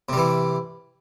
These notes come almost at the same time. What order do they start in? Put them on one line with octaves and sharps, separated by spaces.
C3 G3 E3